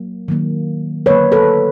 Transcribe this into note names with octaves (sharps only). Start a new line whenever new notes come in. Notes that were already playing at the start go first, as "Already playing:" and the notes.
Already playing: F#3 A#3
D#3 F#3 A#3
D3 F#3 A#3 B4 C#5
A4 B4